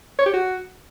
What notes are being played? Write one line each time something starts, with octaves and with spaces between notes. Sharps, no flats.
C#5
G4
F#4